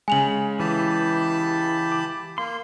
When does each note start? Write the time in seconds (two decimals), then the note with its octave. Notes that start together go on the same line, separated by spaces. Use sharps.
0.08 C#3 G#3 G#5 F7 F#7
0.60 E3 G4 A5 B5
1.92 D6
2.38 A#3 C6